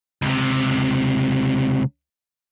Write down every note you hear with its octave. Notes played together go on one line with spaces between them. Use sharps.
C#2 C3